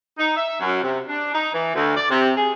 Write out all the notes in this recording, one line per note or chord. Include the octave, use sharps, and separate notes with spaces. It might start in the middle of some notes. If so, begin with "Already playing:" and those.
D#4
E5
F#2
C3
D4
D#4
E3
D2
D5
C3
G#4